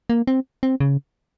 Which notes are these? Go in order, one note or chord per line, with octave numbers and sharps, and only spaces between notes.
A#3
C4
C4
C#3